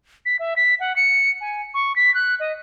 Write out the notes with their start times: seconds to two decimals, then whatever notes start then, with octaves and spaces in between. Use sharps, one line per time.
0.26 B6
0.39 E5
0.56 B6
0.80 F#5
0.96 C#7
1.41 G#5
1.74 C#6
1.96 B6
2.14 F#6
2.40 D#5